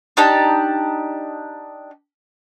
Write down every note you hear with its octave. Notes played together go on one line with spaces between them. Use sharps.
D4 D#4 G4 A5